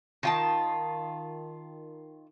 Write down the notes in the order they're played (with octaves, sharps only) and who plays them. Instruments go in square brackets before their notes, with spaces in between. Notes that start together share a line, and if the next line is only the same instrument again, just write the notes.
[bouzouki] D#3 F4 A5